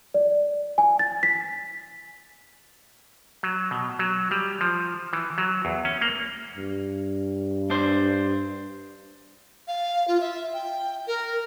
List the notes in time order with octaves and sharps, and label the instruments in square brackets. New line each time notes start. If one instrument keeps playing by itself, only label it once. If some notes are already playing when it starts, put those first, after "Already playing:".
[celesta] D5
G#5
A6
B6
[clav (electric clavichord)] F#3
B2
F#3
G3
F3
E3
F#3
E2
C#4
A#3
[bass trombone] G2
[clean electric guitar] D4 C5
[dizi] F5
F4
E5
G5
A#4